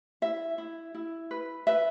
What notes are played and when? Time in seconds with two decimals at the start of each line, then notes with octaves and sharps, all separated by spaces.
0.22 E4 E5
0.58 E4
0.94 E4
1.31 B4
1.67 B4 E5